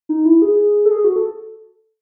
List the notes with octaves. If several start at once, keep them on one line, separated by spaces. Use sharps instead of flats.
D#4
E4
G#4
A4
G#4
F#4
A4